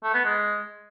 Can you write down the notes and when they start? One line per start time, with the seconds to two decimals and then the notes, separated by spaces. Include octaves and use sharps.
0.03 A3
0.14 B3
0.25 G#3